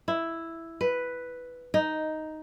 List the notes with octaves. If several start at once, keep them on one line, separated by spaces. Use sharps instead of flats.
E4
B4
D#4